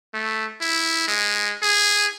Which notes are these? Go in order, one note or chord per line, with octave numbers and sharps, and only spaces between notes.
A3
E4
G#3
G#4